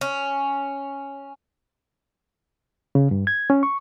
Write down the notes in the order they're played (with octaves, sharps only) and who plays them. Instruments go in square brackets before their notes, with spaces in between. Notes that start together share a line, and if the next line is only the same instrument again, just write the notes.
[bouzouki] C#4
[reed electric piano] C#3
G2
G#6
C#4
C#6